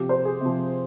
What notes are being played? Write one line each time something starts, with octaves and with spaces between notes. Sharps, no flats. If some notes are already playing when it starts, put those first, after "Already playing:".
Already playing: C3 F3 G4
C5
G#4
C3 F3